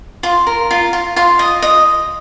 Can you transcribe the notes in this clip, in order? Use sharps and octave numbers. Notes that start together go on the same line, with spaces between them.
F4 C6
A#4
F4
F4
F4 C6
D#5
D#5